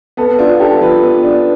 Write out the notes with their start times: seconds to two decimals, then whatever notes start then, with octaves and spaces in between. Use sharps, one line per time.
0.17 B3 A4
0.38 D4 F4
0.59 G4 A4
0.81 F3 B4
1.02 B3
1.23 D4